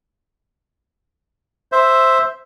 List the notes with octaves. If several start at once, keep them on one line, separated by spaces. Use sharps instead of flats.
C5 E5